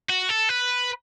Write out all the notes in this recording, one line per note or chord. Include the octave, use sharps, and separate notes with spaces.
F#4
A4
B4